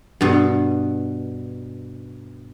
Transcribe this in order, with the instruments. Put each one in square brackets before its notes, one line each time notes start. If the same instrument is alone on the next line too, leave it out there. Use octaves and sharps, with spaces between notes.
[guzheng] G2 B2